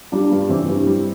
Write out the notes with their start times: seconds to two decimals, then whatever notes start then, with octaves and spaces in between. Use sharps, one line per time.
0.12 G3 D4 F4
0.31 G2
0.49 E3 C4 E4
0.68 G2
0.87 G3